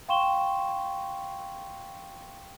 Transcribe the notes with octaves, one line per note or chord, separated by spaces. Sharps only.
F5 G5 C6 C#6 E7 G7